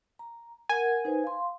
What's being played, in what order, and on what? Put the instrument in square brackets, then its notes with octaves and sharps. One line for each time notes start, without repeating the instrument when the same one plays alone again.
[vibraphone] A#5
[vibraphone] A#4 F#5 [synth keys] G#5
[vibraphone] D#4 B4 C5
F5 C6